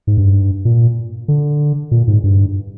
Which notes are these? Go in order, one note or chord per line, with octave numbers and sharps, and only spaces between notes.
G#2
G2
A#2
D3
A#2
G#2
G2